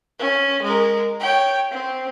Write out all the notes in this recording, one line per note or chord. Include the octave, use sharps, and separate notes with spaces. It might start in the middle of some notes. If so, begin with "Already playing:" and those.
C#4
G#3 A#4
C#5 G5
C4